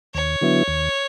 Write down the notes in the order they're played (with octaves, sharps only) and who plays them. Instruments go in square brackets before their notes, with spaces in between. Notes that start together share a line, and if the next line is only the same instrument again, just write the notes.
[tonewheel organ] D#2 [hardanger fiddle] C#5
[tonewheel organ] D3 F#3 B3 E4
D#2